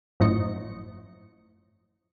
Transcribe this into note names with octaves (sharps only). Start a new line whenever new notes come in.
G#1 F#2 A2 F3 D#5 C#7